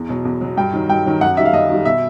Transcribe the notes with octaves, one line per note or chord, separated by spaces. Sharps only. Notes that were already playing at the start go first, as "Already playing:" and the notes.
Already playing: E2
B2 F#3
E2
B2 F#3
G2 G5
D#3 F#3
G2 G5
D#3 F#3
F#2 F#5
D#3 G3 E5
F5
F#2 D#5
D#3 G3
B2 E5